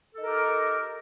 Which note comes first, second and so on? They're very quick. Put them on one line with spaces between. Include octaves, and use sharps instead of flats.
A4 D#4 A#4 G4